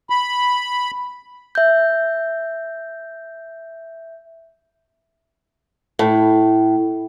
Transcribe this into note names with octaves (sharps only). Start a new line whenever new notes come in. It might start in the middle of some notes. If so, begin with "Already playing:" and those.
B5
E5 G6
A2